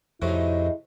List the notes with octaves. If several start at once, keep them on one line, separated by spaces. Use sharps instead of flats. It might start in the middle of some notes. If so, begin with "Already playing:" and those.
F2 A2 C3 F#3 G#3 A3 D#4 E4